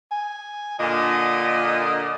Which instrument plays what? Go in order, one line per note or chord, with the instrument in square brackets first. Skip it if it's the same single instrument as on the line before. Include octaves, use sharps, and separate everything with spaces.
[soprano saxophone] G#5
[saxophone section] A#2 D3 [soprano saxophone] D#5